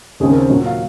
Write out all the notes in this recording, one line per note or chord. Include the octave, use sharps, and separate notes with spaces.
D#2 C#3 G#3 C4 G#4
A#4
C5
A#2 F#3 A#3
F5